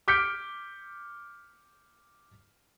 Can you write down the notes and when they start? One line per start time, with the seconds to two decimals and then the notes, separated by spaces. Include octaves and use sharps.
0.08 D6 F6 G6 B6 C#7 D7